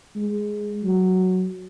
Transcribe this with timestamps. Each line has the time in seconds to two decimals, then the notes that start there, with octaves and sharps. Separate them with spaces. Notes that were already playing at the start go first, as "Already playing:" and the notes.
0.16 G#3
0.83 F#3